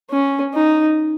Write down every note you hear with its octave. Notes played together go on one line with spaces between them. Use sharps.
C#4
D#4